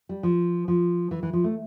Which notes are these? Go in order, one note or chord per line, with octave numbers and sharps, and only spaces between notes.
G3
F3
F3
E3
E3
F3
A3